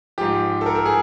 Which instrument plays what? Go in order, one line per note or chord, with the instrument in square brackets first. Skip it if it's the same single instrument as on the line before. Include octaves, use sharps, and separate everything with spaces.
[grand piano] G#2 F3 G4
A4
A#4
A4
G#4